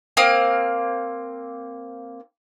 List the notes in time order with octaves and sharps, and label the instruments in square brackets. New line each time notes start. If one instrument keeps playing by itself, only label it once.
[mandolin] A#3 C4 F5 D#6